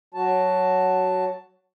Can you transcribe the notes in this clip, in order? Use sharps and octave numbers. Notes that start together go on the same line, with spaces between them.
F#3 F#4 A5